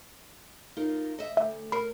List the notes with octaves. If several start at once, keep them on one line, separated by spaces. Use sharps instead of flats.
D#4 F4 A#4
D#5 E5
D2 E5
A#4 B5 C7